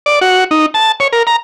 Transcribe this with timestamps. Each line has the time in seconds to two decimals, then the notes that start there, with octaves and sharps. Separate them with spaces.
0.06 D5
0.21 F#4
0.51 D#4
0.74 A5
1.00 C#5
1.13 A#4
1.27 A#5